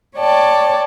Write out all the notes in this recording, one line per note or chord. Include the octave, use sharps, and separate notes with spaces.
C#5 D5 G5 A5